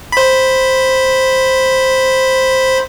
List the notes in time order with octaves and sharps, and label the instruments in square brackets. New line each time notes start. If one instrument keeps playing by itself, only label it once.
[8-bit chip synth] C5 B5